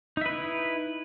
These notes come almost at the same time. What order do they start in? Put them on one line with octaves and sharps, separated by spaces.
D#4 E5 B4 E4